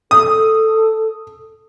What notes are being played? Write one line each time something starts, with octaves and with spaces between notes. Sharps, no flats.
A4 D#6